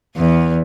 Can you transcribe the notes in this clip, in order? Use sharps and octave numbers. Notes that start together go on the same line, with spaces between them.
E2